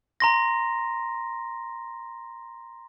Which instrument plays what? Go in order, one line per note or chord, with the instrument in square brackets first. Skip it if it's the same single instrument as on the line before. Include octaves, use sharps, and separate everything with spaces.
[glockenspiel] A#5 C6 A#6